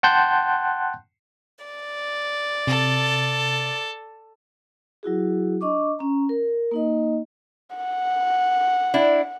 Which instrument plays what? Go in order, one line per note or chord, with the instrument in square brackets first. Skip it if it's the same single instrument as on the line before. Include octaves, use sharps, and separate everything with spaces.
[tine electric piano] F#5 G5 A5 C6 F#6 G6
[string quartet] D5
[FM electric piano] C3 [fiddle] A4
[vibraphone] F#3 E4 F#4 G#4
D4 D#5 C#6 D6
C#4 A#5
A#4
A#3 D#4 D#5
[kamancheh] F#5
[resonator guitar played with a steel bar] D4 E4